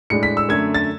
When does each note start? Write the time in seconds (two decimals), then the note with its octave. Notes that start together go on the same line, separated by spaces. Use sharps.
0.10 A2 G#3 D4 C#7
0.23 B6
0.37 E6
0.49 F#2 D3 A3 G#6
0.75 A6